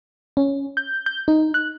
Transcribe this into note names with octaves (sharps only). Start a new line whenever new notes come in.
C#4
G6
G6
D#4
F#6